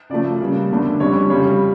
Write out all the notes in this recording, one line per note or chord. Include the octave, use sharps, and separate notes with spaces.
C#3 F3 A3 D5
C#3 G3 A#3
E2 D3 A3 D4
F2 D3 G3 C#4 C#5
F2 C#3 G3 C#5